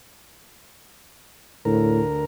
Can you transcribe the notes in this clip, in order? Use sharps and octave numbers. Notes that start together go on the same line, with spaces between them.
D2 A2 A#4